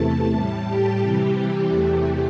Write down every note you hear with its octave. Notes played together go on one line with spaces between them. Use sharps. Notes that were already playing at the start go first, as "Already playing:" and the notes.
Already playing: E2 C3 E3 A3 A5
A2 G3 A5
G4
C3 E3 G3
E2 C3 E3 A3 G4